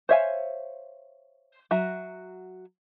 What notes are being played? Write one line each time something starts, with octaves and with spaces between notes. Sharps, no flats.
C5 C#5 E5 F5 G#5
F#3 F#4 E5 A#5